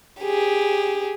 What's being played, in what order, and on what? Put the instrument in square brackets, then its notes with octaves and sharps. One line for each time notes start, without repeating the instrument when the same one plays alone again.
[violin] G4 G#4